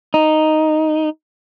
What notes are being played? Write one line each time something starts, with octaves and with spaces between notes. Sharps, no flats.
D#4